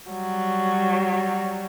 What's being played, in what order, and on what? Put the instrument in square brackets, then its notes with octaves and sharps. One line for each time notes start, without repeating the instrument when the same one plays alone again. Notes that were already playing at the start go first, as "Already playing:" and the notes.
[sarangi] F#3 [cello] G3